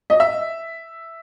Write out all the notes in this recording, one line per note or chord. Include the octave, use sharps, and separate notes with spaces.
D#5
E5